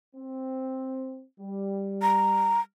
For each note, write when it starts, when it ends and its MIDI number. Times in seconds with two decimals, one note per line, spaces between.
0.16 1.25 60
1.40 2.62 55
2.02 2.60 82